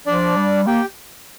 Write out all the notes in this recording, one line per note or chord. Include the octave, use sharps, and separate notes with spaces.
F3 D4 D5
G3
A#3 G4 G5